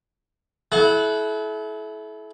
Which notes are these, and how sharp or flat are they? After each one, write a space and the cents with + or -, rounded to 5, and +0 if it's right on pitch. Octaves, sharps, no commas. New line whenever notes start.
E4 -10 A4 -40 F#5 +0